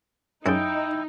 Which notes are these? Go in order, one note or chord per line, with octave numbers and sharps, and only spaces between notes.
F#2 D#4 E4 G#4 G5 D#6